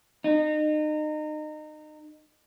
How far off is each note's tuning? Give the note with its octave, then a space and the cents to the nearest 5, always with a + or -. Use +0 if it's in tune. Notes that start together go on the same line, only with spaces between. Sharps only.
D#4 -30